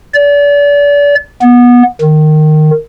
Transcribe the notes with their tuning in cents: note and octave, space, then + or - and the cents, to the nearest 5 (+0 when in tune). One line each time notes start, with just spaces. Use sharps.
D5 -35
B3 -20
D#3 -15